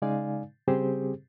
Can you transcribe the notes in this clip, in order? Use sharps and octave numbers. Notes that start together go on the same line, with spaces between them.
C#3 G#3 D#4 D5 F5 G#5
C#3 G3 C4 G4 G#4 C5